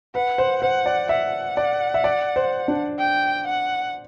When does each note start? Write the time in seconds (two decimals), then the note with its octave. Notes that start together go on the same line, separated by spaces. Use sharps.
0.15 B4 F#5
0.38 C5
0.62 C5 F#5
0.86 D5
1.09 E5 F#5
1.57 D5
1.94 E5
2.04 D5
2.36 C5
2.68 D4
2.99 G5
3.46 F#5